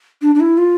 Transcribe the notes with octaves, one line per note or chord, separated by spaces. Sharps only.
D4
D4
E4
F4